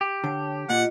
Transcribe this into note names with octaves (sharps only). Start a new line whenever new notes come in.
G4
D3 C#5 A5
A#2 F4 D#5 F#5